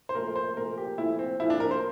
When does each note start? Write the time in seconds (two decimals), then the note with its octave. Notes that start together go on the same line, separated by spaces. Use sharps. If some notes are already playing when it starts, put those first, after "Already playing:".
0.09 C5
0.15 A#2 F3 A3 A#4
0.36 C5
0.57 A#2 F3 A3 A#4
0.78 G4
0.98 A#2 F3 A3 E4
1.19 C4
1.40 A#2 F3 A3 E4
1.50 D4
1.60 A#4
1.71 C5